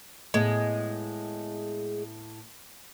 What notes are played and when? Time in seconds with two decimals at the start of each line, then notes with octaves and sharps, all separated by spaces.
0.34 A2 G#3 B3